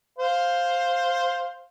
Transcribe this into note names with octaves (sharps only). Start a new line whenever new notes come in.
C5 F5